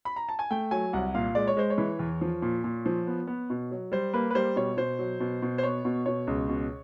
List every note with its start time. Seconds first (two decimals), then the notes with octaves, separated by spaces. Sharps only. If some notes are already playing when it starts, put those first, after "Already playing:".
0.05 B5
0.16 A#5
0.29 A5
0.39 G#5
0.51 A3 G5
0.71 F#3 G#5
0.93 C2 F#5
1.15 A#2 F5
1.35 G#3 D5
1.47 C#5
1.57 G#3 C5
1.70 C#5
1.78 E3
1.99 E2
2.21 F3
2.42 A#2
2.64 A#2
2.86 F3
3.07 B3
3.27 B3
3.50 B2
3.71 F#3
3.92 G3 C5
4.14 A#3 B4
4.31 B4
4.35 G3 C5
4.56 B2 C#5
4.77 B2 C5
4.99 F#3
5.20 B2
5.42 B2
5.58 C5
5.63 B3 C#5
5.85 B2
6.06 B2 C#5
6.27 C#2
6.49 B2